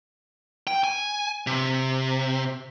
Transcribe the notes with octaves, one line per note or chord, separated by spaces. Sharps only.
G5
G#5
C3